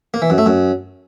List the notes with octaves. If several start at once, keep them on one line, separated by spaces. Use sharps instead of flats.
A#3
E3
F#2
A3
F#2